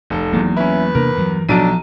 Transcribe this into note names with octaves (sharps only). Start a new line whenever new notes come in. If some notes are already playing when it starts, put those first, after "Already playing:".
F1 A4
E2 F#3 A#3
C#4 E4 B4
C3 A#3 D4 A#4
G2 E3 F#3
B1 F3 F#3 D4 A5 D7 D#7